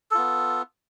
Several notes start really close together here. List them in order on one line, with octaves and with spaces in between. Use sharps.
A4 F4 B3